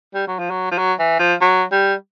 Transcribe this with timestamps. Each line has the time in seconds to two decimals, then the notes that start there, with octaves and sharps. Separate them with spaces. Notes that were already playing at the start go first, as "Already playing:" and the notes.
0.14 G3
0.27 F#3
0.39 F3
0.50 F#3
0.71 F3
0.78 F#3
0.99 E3
1.19 F3
1.41 F#3
1.72 G3